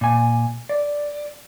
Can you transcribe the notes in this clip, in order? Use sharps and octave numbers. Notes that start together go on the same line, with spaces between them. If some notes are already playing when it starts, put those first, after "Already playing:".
A#2 G#5
D5